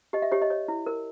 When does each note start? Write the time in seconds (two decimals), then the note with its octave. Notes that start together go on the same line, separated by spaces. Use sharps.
0.13 G4 D#5
0.22 E5
0.32 G4 C#5
0.42 D#5
0.50 C#5
0.68 E4
0.86 A#4